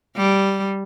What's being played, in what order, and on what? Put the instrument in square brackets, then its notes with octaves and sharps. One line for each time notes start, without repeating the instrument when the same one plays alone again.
[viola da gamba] G3